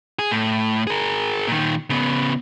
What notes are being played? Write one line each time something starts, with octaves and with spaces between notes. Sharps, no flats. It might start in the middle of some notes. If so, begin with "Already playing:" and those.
G#4
A2
G#4 A#4
A#2 D#3
C#3 B3